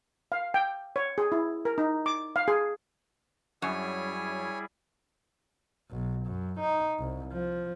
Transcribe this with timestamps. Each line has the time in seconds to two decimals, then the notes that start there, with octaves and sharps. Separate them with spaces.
0.32 F5
0.54 G5
0.96 C#5
1.18 G#4
1.32 E4
1.65 A#4
1.78 D#4
2.06 D6
2.36 F5
2.48 G#4
3.62 F#2 G3 E4 G#4 C#5 G#5
5.91 B1
6.26 F#2
6.60 D#4
6.99 C2
7.33 F3